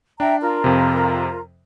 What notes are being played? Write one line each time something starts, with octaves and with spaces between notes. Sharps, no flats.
D4 E5 G5 A#5
F4 A#4 A#5
F2 C3